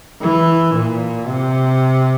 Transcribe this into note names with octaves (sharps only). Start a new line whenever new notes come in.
E3
A#2
C3